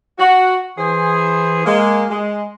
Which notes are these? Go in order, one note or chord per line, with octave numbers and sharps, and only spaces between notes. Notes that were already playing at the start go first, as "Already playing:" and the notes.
F#4
E3 G#4 C5
G#3 A#3
G#3